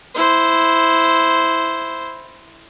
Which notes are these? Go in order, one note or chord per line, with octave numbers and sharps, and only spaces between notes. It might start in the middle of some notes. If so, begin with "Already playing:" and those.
E4 C5